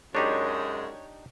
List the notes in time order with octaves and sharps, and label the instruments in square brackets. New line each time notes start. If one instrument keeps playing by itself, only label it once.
[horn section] F#2 G#3 [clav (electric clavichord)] D4 D#4 G4 [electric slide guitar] C#5